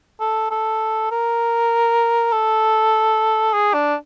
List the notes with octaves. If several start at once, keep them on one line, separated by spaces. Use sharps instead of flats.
A4
A4
A#4
A4
G#4
D4